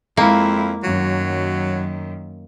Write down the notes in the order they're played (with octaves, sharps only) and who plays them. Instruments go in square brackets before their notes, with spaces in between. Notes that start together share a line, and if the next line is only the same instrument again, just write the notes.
[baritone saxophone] F2 [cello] G#3 E4 [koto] A#3
[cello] F#2 D#3 [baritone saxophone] F#3